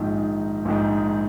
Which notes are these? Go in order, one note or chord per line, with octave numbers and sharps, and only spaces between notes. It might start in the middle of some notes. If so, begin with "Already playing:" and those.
Already playing: A#1 G#2 D#3
A#1 G#2 D#3